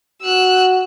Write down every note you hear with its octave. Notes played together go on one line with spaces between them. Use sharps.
F#4 E6 F#6